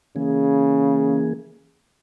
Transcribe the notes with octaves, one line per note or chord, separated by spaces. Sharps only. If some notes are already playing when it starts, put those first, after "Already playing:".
C#3 E3 A#3 G#4